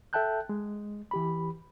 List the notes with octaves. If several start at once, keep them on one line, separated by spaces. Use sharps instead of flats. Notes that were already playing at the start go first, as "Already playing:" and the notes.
A4 E5 G5 A5 F#6 G6
G#3
E3 G4 B5